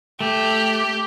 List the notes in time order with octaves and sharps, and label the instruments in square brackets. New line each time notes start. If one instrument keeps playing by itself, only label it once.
[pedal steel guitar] A3 [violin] G4